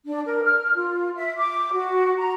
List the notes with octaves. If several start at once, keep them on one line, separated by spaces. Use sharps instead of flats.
D4
A#4
F6
F4
E5
D6
F#4
A#5